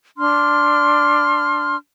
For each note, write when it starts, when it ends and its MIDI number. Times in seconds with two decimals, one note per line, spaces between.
0.18 1.75 62
0.18 1.75 84
0.18 1.75 89